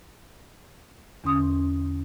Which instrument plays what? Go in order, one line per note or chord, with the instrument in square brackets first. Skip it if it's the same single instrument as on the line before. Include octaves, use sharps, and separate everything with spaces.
[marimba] E2 D3 C#4 C6 D#6